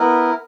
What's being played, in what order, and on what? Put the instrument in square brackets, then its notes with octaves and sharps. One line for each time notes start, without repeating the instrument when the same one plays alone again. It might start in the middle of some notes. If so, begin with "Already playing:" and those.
Already playing: [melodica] B3 E4 A#4